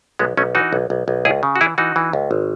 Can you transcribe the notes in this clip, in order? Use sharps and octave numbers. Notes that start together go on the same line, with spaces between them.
B1 G#3 B3
B1 A3 C#4
E3 D#4 F#4
B1
B1
B1
C#2 E4 G#4
C#3
F#4
E3 E4 G#4
E3 D#4 F#4
E3
C#2
G#1